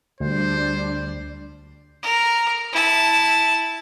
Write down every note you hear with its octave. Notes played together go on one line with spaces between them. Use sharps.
D2 G3 D4 C5 D5
A#4
E4 A5